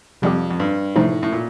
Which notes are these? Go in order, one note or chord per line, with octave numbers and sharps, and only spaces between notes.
F2 C3 G3 C4 G4
F2
G2
A2 C3 F3 A3 D#4
A2
A#2